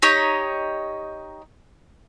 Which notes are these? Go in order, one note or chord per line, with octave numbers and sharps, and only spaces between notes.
D#4 G4 C#5 D#5